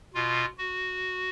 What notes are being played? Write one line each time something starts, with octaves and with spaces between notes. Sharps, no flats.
B2 F4
F#4